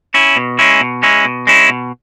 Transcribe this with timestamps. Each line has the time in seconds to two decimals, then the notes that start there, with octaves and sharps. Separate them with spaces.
0.14 C#4 E4
0.36 B2
0.59 G#3 C#4 E4
0.80 B2
1.03 G#3 C#4 E4
1.25 B2
1.47 G#3 C#4 E4
1.69 B2